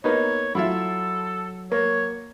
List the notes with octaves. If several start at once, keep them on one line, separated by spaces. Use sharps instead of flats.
A#3 B3 D#4 C#5
F#3 E4 F4 A4 E5
A#3 C#5